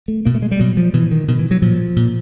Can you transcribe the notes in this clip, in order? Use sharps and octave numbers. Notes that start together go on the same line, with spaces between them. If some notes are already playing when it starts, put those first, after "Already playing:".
A3
B2 A#3
A3
G#3
G3
B2 F#3
F3
B2 E3
D#3
B2 D#3
E3
F#3
A#2 F3
A#2